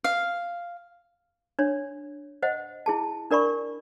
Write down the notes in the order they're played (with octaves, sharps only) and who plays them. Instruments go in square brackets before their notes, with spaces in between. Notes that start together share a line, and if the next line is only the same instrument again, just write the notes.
[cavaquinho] F5
[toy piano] D4 C#5
C5 D#5 F#5
E4 G#4 A5
D4 A#4 D5 B5 C#6